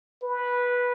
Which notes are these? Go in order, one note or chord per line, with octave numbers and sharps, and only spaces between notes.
B4